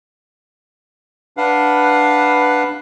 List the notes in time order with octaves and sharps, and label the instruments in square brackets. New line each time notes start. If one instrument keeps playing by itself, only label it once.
[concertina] D4 B4 F5 F#5